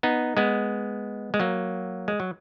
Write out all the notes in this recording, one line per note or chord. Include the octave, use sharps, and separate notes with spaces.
B3 D#4
G#3 B3
G#3
F#3 A#3
G#3
F#3